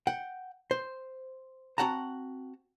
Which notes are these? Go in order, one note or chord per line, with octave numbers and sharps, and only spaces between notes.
F#5 G5
C5
C4 F#4 F#5 A5 A#5